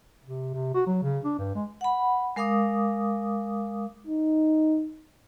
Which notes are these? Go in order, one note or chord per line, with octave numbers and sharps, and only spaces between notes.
C3
C3
F#4
F#3
C#3
D4
G2
G#3
F#5 B5
G#3 A#4 F5 D6 D#6
D#4